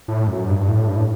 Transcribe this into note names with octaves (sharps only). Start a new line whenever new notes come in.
A2
F#2
G2
A2
G2
A2